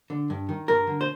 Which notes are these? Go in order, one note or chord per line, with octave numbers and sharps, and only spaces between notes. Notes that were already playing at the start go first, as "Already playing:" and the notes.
D3
G2
D#3
G2 A#4
D3
C5